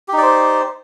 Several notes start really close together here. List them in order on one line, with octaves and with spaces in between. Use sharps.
G4 D#4 D5 C5